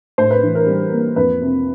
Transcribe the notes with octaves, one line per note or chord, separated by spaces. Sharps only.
A2 C5
B4
E3
A#4
G3
A#3
F2 B4
C3